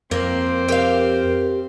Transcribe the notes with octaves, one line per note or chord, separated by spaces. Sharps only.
F2 A#3 C4
G4 A#4 F5